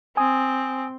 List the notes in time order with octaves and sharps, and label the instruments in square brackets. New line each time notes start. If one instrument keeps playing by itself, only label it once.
[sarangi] C4 [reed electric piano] G#5 D#6